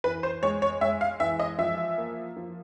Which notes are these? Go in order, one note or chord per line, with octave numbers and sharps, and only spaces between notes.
E3 B4
C5
G#3 C#5
C#5
G#3 E5
F5
E3 E5
D#5
F3 E5
A#3
F3